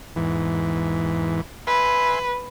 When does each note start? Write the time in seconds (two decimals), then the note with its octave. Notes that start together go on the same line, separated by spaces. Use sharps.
0.16 E2 G#2 E3
1.67 B4 E5 G#5 C6